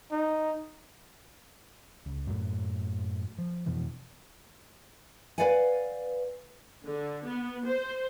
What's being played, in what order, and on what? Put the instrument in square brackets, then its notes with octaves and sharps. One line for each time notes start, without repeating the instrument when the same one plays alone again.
[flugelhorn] D#4
[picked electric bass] C#2
F#2 A2
F3
F2 B2 E3 F3
[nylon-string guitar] B4 C5 D5 F5 F#5 G#5
[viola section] D3
B3
C5